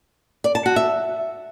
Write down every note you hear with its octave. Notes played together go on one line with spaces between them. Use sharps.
D5
A5
F#4
E5